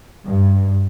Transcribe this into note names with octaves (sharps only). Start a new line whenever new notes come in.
G2